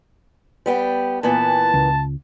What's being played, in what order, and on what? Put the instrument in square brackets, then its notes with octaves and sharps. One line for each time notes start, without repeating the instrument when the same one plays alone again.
[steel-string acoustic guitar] G3 B3 G5
[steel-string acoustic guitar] A#2 E3 B3 [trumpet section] A5
[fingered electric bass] C#2